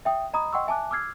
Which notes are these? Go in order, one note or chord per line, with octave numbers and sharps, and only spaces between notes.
E5 G5 D#6
D#5 A#5 B5 D#6
D#5 F#5 G5 C6 C#6 E6
E5 G#5 A5 D6 F#6
D6 E6 F6 G#6 C7